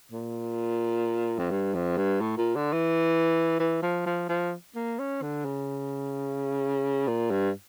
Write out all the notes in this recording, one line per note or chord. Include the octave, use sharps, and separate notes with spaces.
A#2
F2
G2
F2
G2
A2
A#2
D3
E3
E3
F3
F3
F3
A#3
C#4
D3
C#3
A#2
G2